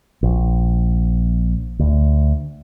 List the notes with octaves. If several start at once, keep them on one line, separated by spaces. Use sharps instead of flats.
A#1
D2